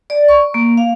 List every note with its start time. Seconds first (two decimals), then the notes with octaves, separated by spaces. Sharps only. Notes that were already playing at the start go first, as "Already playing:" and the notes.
0.10 D5
0.28 C#6
0.54 A#3
0.77 F5